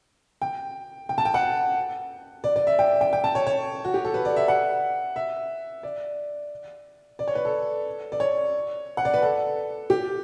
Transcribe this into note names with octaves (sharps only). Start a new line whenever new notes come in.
G5
G5
A5
G5
F#5
D5
D5
E5
G5
G5
G5
A5
C#5
C#5
F#4
G4
A4
B4
D5
E5
F#5
E5
D5
D5
C#5
B4
A4
D5
C#5
F#5
D5
B4
A4
G4